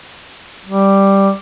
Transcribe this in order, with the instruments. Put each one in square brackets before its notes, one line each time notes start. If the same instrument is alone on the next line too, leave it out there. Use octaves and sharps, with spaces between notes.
[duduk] G3